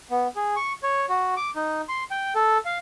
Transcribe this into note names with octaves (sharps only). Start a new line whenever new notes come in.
B3
G#4
C#6
C#5
F#4
D6
D#4
C6
G5
A4
F5